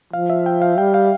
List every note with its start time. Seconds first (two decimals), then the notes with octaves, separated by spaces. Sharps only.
0.13 F3 F5
0.30 E5
0.46 G5
0.62 F5
0.78 G3 G5
0.94 F5